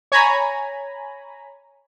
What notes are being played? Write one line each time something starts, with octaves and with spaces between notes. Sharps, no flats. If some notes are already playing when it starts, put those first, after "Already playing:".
C#5 G#5 A#5 B5